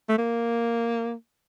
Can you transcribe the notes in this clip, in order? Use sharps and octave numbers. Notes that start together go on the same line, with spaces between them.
A3
A#3